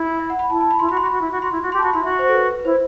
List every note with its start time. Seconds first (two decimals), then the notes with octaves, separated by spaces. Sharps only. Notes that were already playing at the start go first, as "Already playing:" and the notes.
Already playing: E4
0.19 E5
0.30 F#5
0.39 B5
0.50 E4 A5
0.61 A5
0.71 B5
0.79 E4 C6
0.89 F#4 B5
0.97 C6
1.01 F#4
1.06 B5
1.12 F#4
1.21 E4
1.32 F#4
1.42 F#4 C6
1.52 E4
1.62 F#4
1.72 G4 C6
1.78 A5
1.83 F#4 B5
1.93 E4 C6
2.03 F#4 E5
2.19 C5
2.29 A4
2.34 B4
2.59 B4
2.65 E4 C5